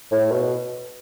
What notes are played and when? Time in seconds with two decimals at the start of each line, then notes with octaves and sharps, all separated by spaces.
0.11 A2
0.32 B2